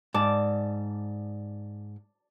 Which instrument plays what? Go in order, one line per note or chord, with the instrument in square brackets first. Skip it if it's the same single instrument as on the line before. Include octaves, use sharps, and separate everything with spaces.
[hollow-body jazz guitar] G#2 [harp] D5 A5 D6